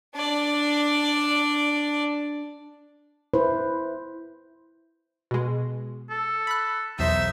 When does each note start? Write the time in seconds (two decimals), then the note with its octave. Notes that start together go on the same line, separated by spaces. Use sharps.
0.15 D4 D5
3.34 E4 B4 C5
5.31 B2 G#3
6.10 A4
6.47 B5 F#6
6.99 B1 E2 D#4 C5 E5